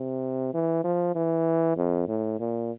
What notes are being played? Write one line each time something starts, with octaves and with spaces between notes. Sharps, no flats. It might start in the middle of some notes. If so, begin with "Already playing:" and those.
Already playing: C3
E3
F3
E3
F2
A2
A#2